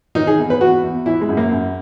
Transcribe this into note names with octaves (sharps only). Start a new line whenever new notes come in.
D#3 D#4
G#4
E2
B4
E2 F#4
E2
E3 E4
G#3
F#2
A#3
F#2